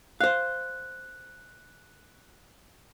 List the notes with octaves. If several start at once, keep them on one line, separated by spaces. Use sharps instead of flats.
C5 F5 F#6